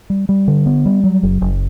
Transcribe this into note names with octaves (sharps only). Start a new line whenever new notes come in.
G3
G3
D3
B3
G3
F#3
F#1
F#1